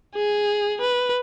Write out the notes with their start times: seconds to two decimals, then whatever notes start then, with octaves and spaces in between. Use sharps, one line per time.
0.15 G#4
0.81 B4